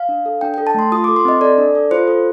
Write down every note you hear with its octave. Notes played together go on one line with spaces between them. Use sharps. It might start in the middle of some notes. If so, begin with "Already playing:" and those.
Already playing: F5
D4
A4
D4 G5
A4 G5
A5
A3 C6
F4 D#6
A4 D6
C6
C4 D#5
A4 D5
D4
A4
F4 C5
A4